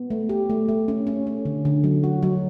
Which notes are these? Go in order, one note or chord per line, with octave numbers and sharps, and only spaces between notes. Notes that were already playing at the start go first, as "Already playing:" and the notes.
Already playing: B3
A3
G4
A3
A3
C#4
C#4
C#4
D3
D3
F#3
F#4
F#3